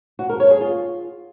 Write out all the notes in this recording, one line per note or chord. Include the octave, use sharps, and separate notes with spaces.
F#4
A#4
C#5
G#4
F4